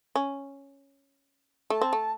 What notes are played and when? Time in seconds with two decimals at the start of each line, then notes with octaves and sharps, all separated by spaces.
0.16 C#4
1.70 A3 A5
1.81 C4
1.93 A3